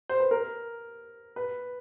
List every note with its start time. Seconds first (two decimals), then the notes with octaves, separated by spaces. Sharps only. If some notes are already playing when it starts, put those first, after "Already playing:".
0.09 C5
0.20 B4
0.31 A#4
1.36 B4